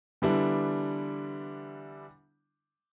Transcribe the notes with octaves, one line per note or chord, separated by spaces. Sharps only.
D3 E3 G3 B3 D4 E4